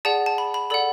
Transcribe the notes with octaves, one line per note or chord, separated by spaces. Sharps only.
G#4 D5 F#5 A5
A5
B5
B5
A4 D5 F#5 B5